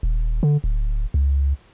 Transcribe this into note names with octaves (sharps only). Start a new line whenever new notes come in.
D#1
D3
D1
C#2